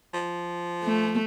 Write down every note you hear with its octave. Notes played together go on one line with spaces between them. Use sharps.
F3
A3